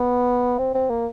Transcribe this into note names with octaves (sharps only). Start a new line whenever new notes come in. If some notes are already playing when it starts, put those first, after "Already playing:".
Already playing: B3
C4
C4
A#3